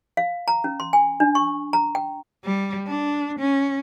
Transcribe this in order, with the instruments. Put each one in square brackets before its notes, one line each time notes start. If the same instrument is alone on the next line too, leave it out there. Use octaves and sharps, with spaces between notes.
[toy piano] F5
A#5
C#4
C6
G#5
D4
C#6
A#5
G5
[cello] G3
D4
C#4